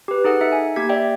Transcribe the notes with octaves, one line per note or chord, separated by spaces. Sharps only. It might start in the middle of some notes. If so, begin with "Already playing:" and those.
G4 B4
D#4 G#4 A4 F#5
D#4 E5 C#7
G#5
A#3 G4 G#6 B6
D5 E5 G5